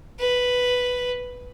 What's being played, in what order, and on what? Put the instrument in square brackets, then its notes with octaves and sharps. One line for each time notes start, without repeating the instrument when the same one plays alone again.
[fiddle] B4